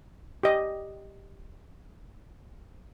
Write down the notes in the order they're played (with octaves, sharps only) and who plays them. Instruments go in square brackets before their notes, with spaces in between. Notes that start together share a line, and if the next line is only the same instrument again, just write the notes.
[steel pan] G4 D#5